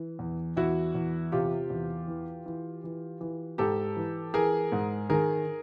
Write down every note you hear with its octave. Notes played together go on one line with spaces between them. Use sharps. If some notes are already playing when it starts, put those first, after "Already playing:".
Already playing: E3
E2
E2 E4 F#4
E2
C3 F4 G4
E2
E3
E3
E3
E3
G#2 G4 A4
E3
E3 G#4 A#4
G#2
D#3 G#4 A#4